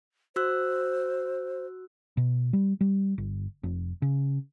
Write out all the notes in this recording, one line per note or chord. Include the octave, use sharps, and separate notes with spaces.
F#4 C5 E6 F#6
B2
G3
G3
G1
F1
C#3